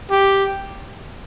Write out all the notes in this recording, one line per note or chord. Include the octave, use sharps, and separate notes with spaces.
G4